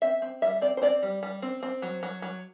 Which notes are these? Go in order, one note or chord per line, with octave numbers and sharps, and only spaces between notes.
C4 E5
C4
G3 E5
C4 D5
C5
C4 D5
G3
G3
C4
C4
F#3
F#3
F#3